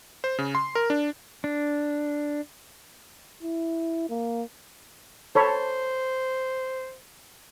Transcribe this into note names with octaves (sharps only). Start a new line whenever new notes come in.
C5
C#3
C6
A#4
D4
D4
E4
A#3
A4 C5 C#5 B5